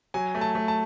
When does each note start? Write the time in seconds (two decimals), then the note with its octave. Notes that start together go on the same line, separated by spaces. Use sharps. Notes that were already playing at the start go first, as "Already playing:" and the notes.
0.14 F#3 G#5
0.35 A3
0.41 A5
0.55 A3
0.68 A5